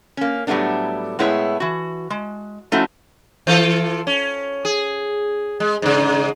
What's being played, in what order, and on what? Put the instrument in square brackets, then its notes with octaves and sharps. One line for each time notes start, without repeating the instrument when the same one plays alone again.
[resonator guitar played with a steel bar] A#3 C#4
A2 F#3 G3 A3 B3 D4
A2 G#3 B3 E4 G#4 C#5
E3 F#4
G#3
F3 A3 C#4 D#4 E4 F#4
[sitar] E3 F4 A4
C#4
G#4
G#3
G#2 C#3